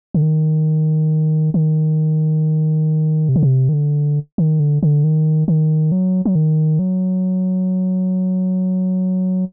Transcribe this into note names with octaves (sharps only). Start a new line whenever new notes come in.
D3
D#3
D#3
C3
D3
C3
D#3
D3
D#3
D3
D3
D#3
D#3
F#3
F#3
D#3
F#3